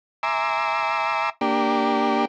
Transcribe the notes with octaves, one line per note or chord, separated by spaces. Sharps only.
E5 G#5 A#5 C6 D6 E6
A#3 D4 G4